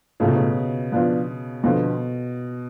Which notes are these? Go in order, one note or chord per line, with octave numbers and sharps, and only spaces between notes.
A2 C#3 F#3 A3 F4 A4
B2
C#3
F3 B3 D4 F4
F2 B2 D3 F3 B3